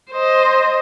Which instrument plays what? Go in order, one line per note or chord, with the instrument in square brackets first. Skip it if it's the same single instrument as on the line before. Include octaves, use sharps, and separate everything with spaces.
[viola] C5 D#5